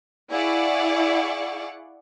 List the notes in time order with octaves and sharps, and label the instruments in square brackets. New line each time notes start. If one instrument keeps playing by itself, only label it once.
[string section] E4 G#4 D5 F5 F#5 C#6